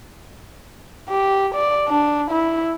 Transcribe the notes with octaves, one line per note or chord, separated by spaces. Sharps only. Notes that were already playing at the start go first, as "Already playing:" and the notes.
G4
D5
D4
E4